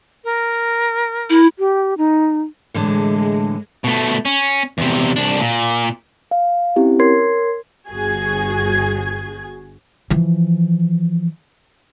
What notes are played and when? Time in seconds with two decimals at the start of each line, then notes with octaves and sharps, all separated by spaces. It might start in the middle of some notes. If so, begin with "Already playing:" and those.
0.24 A#4
1.30 E4
1.59 G4
1.98 D#4
2.74 A2 D3 E3 G#3
3.84 B2 A3
4.25 C#4
4.78 E2 C3
5.16 C2 D4
5.41 A#2
6.31 F5
6.76 C4 C#4 E4 G4
6.99 A#4 C#5 C6 G#6 C7
7.89 G1 G2 F#4 G#4 G#6
10.10 E3 F3